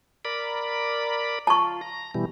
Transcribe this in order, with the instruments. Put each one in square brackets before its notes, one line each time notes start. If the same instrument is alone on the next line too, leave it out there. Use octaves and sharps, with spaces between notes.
[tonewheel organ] A#4 D5 B5
[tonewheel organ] F4 [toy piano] A5 C#6
[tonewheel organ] A#5
B2 E3 G3